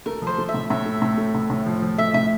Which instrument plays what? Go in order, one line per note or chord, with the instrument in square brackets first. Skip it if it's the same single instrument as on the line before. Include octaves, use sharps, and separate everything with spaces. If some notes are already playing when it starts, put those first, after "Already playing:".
[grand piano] A3 [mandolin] A#4
[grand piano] F3
[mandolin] C5
[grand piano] A3
[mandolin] E5
[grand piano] A2
[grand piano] A2 [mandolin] E5
[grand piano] A3
A2
A3
A2
A2
F3
F3
[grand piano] A3 [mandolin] E5
[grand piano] A2 [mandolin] E5